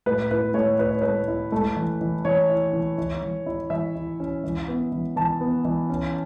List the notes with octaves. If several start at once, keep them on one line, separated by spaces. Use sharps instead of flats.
A2 B4
E4 B4
A2 C#5
E4 B4
C#5
A3 B4
E4
A3
E3
E3
E3 C#5
E4
E3
E3
E3
E4
E3 E5
E4
C#4
E3
B3
E3
E3 A5
B3
E3
C#4